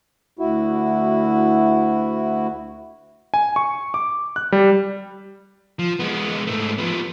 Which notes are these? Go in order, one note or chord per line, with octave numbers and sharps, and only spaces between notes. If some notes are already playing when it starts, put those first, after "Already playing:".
D2 E4 F#4
G#5
C#6
D6
F#6
G3
F3
G#3 B3
G#2 A3
F3 B3